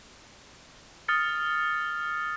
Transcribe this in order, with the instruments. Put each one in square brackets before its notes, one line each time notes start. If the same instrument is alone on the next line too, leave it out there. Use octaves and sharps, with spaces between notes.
[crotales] D#6 F6 A6 C#7